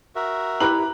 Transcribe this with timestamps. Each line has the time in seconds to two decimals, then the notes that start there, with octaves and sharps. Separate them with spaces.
0.16 F#4 A#4 E5
0.60 E4 G4 B4 A#5 B5 F#7